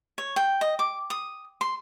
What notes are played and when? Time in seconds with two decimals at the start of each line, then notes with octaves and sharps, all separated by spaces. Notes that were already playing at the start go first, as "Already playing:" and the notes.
0.18 C#5
0.36 G5
0.61 D#5
0.79 D6
1.10 D#6
1.61 C6